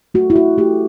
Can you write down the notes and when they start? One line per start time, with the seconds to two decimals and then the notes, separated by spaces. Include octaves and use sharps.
0.14 A3 F#4
0.30 E4
0.36 A3 F#4
0.58 A3 G4